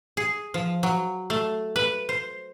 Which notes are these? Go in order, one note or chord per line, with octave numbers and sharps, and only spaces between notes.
G#4
F3
F#3
A3
B4
C5